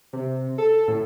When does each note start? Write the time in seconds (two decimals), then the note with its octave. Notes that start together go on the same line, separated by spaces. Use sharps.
0.13 C3
0.58 A4
0.88 A2